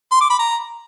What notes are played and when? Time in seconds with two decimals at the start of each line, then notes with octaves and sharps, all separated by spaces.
0.12 C6
0.21 D6
0.30 B5
0.39 A#5